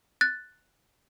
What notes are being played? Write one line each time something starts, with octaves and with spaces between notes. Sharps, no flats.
F#6 A6